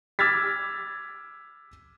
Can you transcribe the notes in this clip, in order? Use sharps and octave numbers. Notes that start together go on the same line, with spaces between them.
D6 E6 F6 G#6 A6 B6